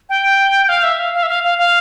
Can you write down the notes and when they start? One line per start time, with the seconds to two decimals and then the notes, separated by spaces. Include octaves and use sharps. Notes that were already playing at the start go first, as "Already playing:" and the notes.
0.09 G5
0.69 F5
0.83 E5
0.99 F5
1.14 F5
1.23 E5
1.29 F5
1.44 F5
1.58 F5